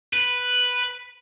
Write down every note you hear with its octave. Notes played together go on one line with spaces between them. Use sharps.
B4